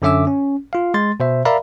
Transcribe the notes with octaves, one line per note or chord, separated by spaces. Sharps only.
F#2 D3 C#4 E5 D6 E6
C#4
F4 F5
G#3 C6 A6
B2 C5 E5
A#4 D5 E5 F5 A#5 B5